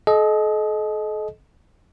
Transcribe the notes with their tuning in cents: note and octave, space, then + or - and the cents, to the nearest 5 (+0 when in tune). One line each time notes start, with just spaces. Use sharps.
A4 -40 D#5 +0